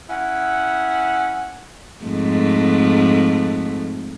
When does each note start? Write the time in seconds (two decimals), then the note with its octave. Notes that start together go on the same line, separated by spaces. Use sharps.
0.10 C#4 E4 F#5
2.05 F2 G#2 A3